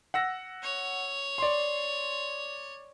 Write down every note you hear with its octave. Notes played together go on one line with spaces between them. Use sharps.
F#5 E6 A#6
C#5
D5 C6